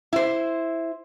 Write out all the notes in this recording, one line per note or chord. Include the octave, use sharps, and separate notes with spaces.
E4 C5